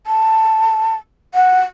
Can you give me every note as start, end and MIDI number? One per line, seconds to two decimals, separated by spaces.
0.07 0.95 81
1.34 1.60 78